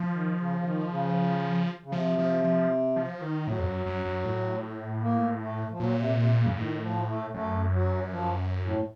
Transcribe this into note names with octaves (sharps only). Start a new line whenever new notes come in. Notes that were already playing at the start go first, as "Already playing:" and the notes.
Already playing: F3
D#3
C#3
C#3
D#3
C#3
C#3
C3 F3
F3
F3
F3
D#3
A2 F#3
F2
F#2
F#2
F#2
A2
A#3
A3
F3
A#2 F#3
C3
C3
C#3
F#2
A2 D#3
F3
A3
F#2 A3
F#3
F3
A2